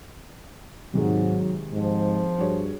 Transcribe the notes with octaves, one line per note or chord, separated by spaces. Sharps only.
G#2 C3 D#3 F#3 G#3
G#2 F3
G2 F#4 G#4 C#5